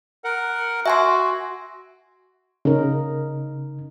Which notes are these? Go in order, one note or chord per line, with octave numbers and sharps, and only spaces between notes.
A#4 F#5
F#4 E5 G#5 C6
C#3 D#4 A#4